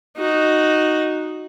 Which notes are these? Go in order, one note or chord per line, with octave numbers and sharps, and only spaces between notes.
D#4 F#4